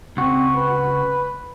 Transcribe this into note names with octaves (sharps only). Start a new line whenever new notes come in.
C#2 C4 F#4
B4